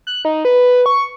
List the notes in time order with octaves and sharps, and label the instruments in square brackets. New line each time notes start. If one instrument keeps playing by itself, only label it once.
[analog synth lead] F#6
D#4
B4
C#6